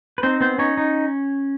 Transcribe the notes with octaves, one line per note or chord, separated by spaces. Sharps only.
B4
C4 D#4 C5
B3 C4 C5
C#4 D#4 C#5
D#4